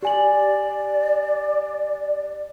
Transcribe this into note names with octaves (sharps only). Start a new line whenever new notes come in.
G4 D5 G#5 F#7